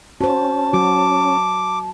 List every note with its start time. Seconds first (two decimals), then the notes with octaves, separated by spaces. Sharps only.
0.21 C#4 F#4 C5 A5
0.73 F#3 F#4 D6